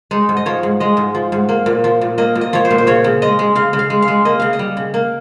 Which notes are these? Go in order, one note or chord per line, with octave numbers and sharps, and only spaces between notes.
G#3 D#4
G#2
D#5
F3 C#5
G#2
G#3 D#5
G#2
F3
G#2
A#3
A#2
F3
A#2
A#3 D#5
A#2
D#5
F3 C#5
C5
A#2
C5
C#3 C#5
C#3
G#3 D#5
G#3
C#3 F5
C#3
F5
G#3
F5
G#3
A#3 D#5
C#3 F5
D#5
G3
C#3
A#3